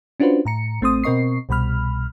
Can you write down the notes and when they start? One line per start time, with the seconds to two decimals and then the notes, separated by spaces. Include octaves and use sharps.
0.20 C#4 D4 F4 F#4 B4 C5
0.45 A2 A#5 C#7
0.81 A1 A3 C4 C6 D#6
1.04 B2 C4 A#4 D#5 C#6 C7
1.49 C2 B2 G3 B5 F6